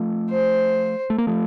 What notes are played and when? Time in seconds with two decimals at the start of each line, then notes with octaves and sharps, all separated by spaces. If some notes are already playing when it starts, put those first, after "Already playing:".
Already playing: F3 A3
0.30 C5
1.10 A3
1.18 A#3
1.27 F3 A3